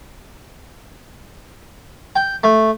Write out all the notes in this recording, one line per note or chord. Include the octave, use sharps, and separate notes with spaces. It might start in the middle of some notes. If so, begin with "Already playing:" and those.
G5
A3